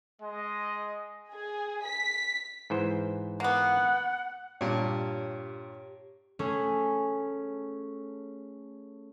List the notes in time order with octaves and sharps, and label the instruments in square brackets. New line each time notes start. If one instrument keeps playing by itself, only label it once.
[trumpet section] G#3 [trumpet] D#5
[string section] G#4
B6
[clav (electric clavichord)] G#2 E3 C5
[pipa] A#3 B3 [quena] F#5
[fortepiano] G2 A#2 [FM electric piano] G4 C#5
[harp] A3 C#4 G#4